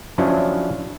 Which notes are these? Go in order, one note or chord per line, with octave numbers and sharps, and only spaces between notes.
F3 F#3 C#4 D4 E4 F4